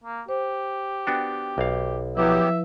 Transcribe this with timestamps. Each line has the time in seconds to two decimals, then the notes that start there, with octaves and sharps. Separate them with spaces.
0.04 A#3
0.29 G4 C5
1.07 B3 D4 F#4 G5
1.58 B1 F5
2.17 F3 F#3 B3 E4 G4 B4 E5